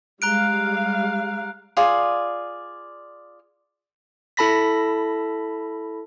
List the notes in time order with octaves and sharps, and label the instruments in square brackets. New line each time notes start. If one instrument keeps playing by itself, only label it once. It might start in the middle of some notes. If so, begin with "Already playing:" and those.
[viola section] G3 G#3 F5 [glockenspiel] A#5 F#6 D7
[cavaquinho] F4 G#4 D5
[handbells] E4 A4 A5 B5 A#6 B6